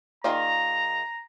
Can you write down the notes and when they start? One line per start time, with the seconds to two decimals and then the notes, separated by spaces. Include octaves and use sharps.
0.24 D#3 A#3 F4 G#4 D5 A#5